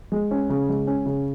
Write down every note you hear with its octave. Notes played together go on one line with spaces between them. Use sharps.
G#3
C#4
C#3
G#3
C#4
C#3